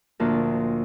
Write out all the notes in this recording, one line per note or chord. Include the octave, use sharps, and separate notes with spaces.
D2 A#2 F3 A#4